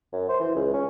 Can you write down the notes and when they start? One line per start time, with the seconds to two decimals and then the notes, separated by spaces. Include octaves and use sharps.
0.12 F#2
0.28 C5
0.40 E3
0.55 C#2
0.73 C#4